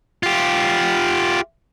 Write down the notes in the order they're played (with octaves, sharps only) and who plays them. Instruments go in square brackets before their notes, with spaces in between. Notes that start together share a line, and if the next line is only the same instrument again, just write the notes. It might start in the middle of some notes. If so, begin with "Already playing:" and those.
[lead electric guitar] F4 G4